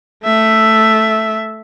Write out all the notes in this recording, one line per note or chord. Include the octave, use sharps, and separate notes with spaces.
A3 E5